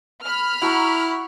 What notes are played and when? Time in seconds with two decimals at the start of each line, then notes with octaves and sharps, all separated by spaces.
0.24 B5 F6
0.62 E4 F#4 A#5 C#6